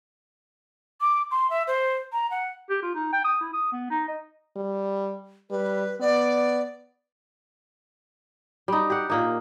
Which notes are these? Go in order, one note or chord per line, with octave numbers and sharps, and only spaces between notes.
D6
C6
E5
C5
A#5
F#5
G4
F4
D#4
G5
D#6
E4
D#6
B3
D#4
D#5
G3
G3 B4
B3 D5
G3 D#4
G4 F#5
A#2 A#3 D#4